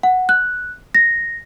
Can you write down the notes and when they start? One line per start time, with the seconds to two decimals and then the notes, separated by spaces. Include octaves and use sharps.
0.03 F#5
0.29 F#6
0.95 A#6